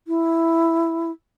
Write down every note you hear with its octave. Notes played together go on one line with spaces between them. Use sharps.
E4